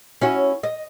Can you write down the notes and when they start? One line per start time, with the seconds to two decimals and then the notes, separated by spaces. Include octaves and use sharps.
0.21 C#4 E4 F#4
0.63 D#5